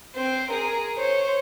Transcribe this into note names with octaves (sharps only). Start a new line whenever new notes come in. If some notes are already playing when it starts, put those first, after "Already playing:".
C4 C5
G#4 A#4
C5 C#5